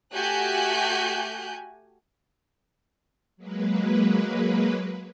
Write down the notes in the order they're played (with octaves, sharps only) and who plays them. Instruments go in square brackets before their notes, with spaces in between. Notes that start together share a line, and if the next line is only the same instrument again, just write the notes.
[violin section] A3 F#4 G4 G#5 F#6 G6
[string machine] F#3 G#3 A#3 B4